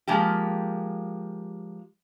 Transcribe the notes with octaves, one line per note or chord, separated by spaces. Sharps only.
F3 G#3 A#3 G4